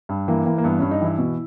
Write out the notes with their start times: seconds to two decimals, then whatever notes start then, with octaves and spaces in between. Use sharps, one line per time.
0.09 G2
0.28 E3 A#3
0.46 E3 A#3
0.58 A#3
0.64 G2 B3
0.79 G2 C#4
0.91 D#4
1.01 E3 E4
1.18 B2